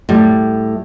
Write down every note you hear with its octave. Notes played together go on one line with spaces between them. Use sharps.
A2 G3